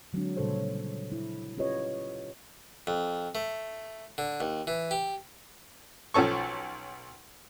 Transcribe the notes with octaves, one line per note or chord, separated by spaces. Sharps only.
D3 F#3 G#3 C4 D4
A#2 C#3 G3 A4 C5 C#5
E4
C#4 F4 G4 B4 C#5 D#5
F2
A3
D3
D#2
E3
G4
B1 F3 C#4 A4 C#6